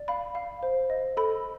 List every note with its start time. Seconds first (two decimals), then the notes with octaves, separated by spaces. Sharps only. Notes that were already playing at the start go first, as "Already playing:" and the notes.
Already playing: D5
0.08 F5 B5
0.35 F5
0.63 C5
0.90 D#5
1.17 A4 B5